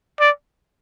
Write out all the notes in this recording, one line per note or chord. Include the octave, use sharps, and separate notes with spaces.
D5